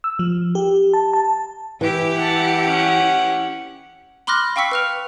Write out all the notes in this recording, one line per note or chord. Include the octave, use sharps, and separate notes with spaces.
E6
F3
G4
A5
A5
E3 E4 G4
F#5 A5
C#4 F#5
B5 C6 D6 F6 F#6 A#6
F5 G5 C#6 E6 B6 C#7
B4 F6 F7